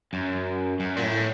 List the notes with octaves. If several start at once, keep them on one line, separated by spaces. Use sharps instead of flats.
F#2
F#2
A#2
A2